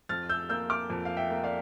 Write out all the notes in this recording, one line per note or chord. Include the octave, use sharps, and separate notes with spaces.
F2 F6 A6
E6 G6
A#3 E6 G6
D6 F6
F2
F5
E5 G5
A#3
D5 F5